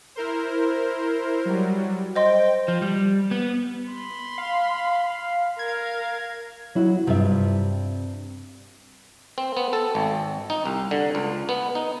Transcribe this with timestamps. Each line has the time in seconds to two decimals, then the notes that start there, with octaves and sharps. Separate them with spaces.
0.16 E4 A#4 C5
1.45 F#3 G3
2.16 C5 D#5 G5 C6
2.68 F3
2.82 G3
3.31 B3
3.88 B5 C6
4.38 F5
5.59 A#4 F5 G#6
6.75 F#3 E4 F#4
7.07 G2 C3 C4 F4 E5
9.38 C4
9.57 B3
9.73 A4
9.95 G#1
10.50 D#4
10.66 C2
10.91 D3
11.15 C#2
11.49 B3
11.75 D#4